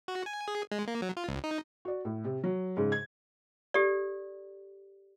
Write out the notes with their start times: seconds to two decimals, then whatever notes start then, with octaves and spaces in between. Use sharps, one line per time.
0.08 F#4
0.26 G#5
0.48 G#4
0.71 G#3
0.87 A#3
1.02 F#3
1.17 F4
1.28 C#2
1.44 D#4
1.85 F#4 D5
2.05 A2
2.24 C3
2.44 F#3
2.77 G#2 C#3
2.92 G#6
3.74 G4 A4 D5